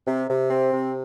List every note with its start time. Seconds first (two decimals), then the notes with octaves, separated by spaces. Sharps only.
0.07 C3
0.28 C3
0.50 C4
0.72 C3